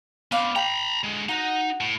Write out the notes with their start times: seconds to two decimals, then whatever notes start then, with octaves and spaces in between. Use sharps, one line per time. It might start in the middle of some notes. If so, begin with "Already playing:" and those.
0.32 B3 C4 D5 F5 B5
0.56 G5 A#5 B5
1.04 D3 G#3
1.29 D#4 F#4 F#5
1.81 A2